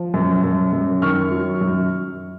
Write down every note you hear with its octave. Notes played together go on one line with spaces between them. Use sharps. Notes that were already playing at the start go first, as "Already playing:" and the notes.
Already playing: F3
F#2
F#2
F#2
D#3 C#6 F6
F#3
F#2